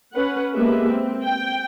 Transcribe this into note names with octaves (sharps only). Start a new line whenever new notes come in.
C#4 B4 F#5
G#3 A#3 B3 G4 B4 E5
C4
G5